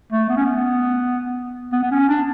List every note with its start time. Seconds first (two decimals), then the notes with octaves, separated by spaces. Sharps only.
0.12 A3
0.30 B3
0.37 C#4
0.45 B3
1.73 B3
1.83 B3
1.91 C#4
2.09 D4